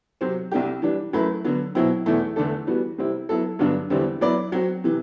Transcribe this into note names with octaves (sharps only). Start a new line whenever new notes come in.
C3 F#3 C4 F#4 C5
C2 C3 G3 D4 G4
E3 G3 D4
F#2 F#3 A3 E4 B4
D3 F#3 B3
B2 F#3 C4 E4
E2 B2 A3 E4
E2 D3 A3 D4 A4
E3 G3 B3 F#4
C3 G3 C4 E4
F#3 B3 E4 A4
G2 D3 F#3 B3 D4
E2 D3 G3 C4 E4
F#3 B3 E4 B4 D5
F#3 C4 F#4
C3 E3